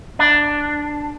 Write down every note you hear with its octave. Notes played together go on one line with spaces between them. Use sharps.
D4